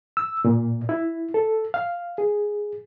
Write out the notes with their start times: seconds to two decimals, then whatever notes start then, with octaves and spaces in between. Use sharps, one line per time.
0.17 E6
0.45 A#2
0.89 E4
1.34 A4
1.74 F5
2.18 G#4